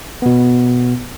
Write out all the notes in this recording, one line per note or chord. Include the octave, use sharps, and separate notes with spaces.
B2 B3